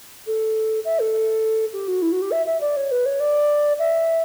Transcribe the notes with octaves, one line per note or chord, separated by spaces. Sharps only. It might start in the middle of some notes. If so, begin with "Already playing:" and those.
A4
E5
A4
G4
F#4
E4
F#4
G4
E5
E5
D5
C#5
B4
C#5
D5
E5